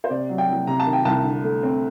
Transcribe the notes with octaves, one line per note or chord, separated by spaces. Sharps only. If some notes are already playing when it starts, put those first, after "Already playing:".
C5
C3 D5
F#3
G5
C2
C3 A#5
A5
D#3
G5
C2 A5
D3
A3
C4